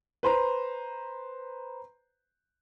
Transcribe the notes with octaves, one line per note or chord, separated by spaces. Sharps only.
B4 C5 A#5